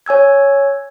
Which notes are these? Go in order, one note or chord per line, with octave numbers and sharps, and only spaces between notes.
C#5 G#5 E6 G#6